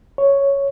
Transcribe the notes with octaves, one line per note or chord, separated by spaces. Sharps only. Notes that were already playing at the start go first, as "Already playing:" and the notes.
C#5